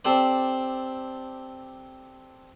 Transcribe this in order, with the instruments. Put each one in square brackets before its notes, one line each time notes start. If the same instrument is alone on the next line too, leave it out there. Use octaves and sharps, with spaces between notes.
[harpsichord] C4 G4 A4 C5 D5